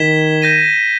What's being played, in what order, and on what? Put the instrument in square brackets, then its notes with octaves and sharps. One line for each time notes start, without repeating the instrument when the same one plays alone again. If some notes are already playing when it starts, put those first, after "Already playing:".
Already playing: [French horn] D#3 [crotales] G#6 B6 E7 G7
[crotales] G6 A#6 D#7